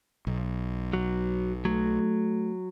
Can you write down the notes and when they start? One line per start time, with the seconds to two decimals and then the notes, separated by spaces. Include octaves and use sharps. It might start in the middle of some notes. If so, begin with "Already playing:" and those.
0.27 B1
0.94 F#3
1.65 F#3 A3